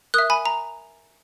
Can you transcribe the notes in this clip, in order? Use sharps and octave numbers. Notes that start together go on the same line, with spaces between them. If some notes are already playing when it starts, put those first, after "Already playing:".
A#4 E5 D#6 F#6
G#5 B5
A#5